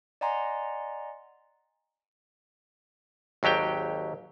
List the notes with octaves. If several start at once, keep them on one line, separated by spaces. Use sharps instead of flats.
D5 D#5 F#5 G#5 A#5 C6
G#1 D#2 F#3 G4 G5